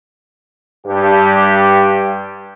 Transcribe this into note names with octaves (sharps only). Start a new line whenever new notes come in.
G2 G4